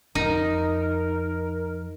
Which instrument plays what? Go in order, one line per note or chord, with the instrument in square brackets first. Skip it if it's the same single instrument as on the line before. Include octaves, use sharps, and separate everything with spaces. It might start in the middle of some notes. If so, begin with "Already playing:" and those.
[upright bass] F2 [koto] D#4 [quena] A#4